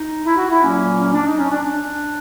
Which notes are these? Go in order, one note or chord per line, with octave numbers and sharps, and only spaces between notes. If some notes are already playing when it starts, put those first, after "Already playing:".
Already playing: D#4
E4
F#4
E4
A#2 F#3 A#3 C#4
C#4
D4
D#4
C#4
D4
D4